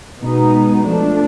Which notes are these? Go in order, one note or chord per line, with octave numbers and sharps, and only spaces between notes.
B2 G#3 B3 D#4
F3 A3 D4